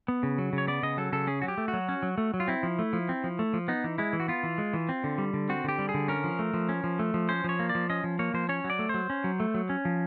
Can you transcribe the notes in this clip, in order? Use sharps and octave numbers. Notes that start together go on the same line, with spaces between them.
B3
C#3
F#3
C#3
C#5
B3 D5
C#3 D#5
F#3 A4
C#3 A4
C#4 G#4
F#3 F#4
G4
A3
F#4
F#3
C#4
F#3
A3
F#3
F4
C4 E4
F3
A3
F3
C4
F3
A3
F3
B3 D#4
E3
G#3 E4
E3
F#4
B3 F4
E3
G#3
E3
C4
D3
G3
D3
C4 F#4
D3 G4
G3
G#4
D3
C#4 A#4
F3
A3
F3
C#4
F3
A3
F3
C#4 C5
F3 C#5
A#3
D5
F3
C#4 D#5
F3
A#3 C#5
F3 C5
C#4 C#5
F#3
D5
A3
F#3 C5
C#4
F#3
A3
F#3
C#4
F3